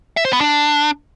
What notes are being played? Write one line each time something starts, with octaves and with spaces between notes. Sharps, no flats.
E5
C5
B3
D4